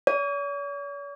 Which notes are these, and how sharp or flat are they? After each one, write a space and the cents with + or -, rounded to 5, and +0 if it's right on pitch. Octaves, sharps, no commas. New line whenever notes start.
C#5 +45